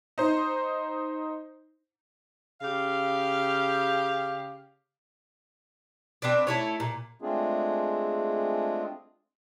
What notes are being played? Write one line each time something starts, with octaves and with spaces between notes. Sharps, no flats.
D#4 C5
C#3 G4 F5
C4 D4 B4 D5
A3 E4 C#5
A#2
G#3 A3 C4 D4 F4 G#4